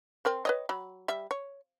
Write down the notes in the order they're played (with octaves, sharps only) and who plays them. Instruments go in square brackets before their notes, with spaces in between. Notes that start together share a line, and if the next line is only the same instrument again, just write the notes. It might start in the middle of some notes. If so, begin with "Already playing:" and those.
[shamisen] C4 A#4 C5
B4 C#5 D#5
F#3 B5
G3 E5
C#5